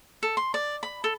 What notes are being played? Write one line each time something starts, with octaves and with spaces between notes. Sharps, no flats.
A4
C6
D5
B5
A4